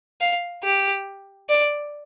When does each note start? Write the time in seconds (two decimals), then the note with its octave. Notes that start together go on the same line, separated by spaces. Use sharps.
0.21 F5
0.63 G4
1.49 D5